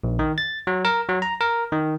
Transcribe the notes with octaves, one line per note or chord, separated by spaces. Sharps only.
A#1
D#3
A6
F#3
A#4
F#3
A#5
A#4
D#3